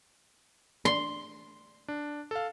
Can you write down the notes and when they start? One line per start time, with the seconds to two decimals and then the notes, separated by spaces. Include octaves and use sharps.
0.85 C6
1.88 D4
2.31 A4 F5